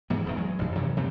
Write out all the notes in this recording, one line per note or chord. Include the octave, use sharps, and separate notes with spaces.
G#2 E3 B3
D1 E2 D#3
F#3 G#3
A1 F#2
C3 D#3 E3 F#3
C3 G3 A3 C4